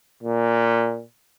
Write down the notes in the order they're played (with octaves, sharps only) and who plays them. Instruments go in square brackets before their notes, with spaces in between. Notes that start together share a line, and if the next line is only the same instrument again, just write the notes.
[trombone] A#2